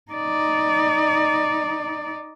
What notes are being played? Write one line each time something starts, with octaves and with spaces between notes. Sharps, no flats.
D#4 D5